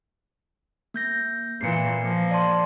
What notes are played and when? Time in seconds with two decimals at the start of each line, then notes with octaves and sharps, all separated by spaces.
0.94 A#3 G6 A#6
1.61 A#2 E3 C7 C#7
2.01 F3 A#3
2.31 D5 A5 C6